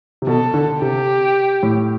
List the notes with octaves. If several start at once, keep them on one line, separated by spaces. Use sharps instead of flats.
C3
B2 A4
D3
C3 G4
A2